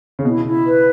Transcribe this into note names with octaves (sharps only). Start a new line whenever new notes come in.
C#3
B2 E4
E4
B4